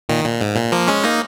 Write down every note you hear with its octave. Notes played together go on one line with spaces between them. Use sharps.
A#2 D#3
A#2
G#2
A#2
F3 A#3
G#3 C#4
A#3 D#4